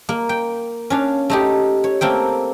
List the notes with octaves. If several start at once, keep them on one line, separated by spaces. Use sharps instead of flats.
A#3
G5
C#4 D4 F5
A3 D#4 G4
C#5
A3 A#3 C4 G5